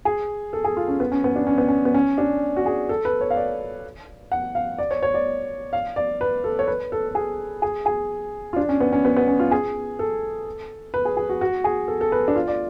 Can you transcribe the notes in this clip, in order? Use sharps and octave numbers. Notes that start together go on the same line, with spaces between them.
G#4
A4
G#4
F4
C#4
B3
C#4
B3
D4
C#4
B3
C#4
B3
C#4
D4
F#4
G#4
A4
B4
C#5
F5
D5
F#5
F5
D5
C#5
C#5
D5
F5
D5
B4
A4
C#5
B4
A4
A4
G#4
G#4
G#4
F4
D4
C#4
B3
C#4
B3
B3
C#4
F4
G#4
A4
B4
G#4
G#4
F#4
F#4
G#4
A4
A4
B4
D4
F4
D5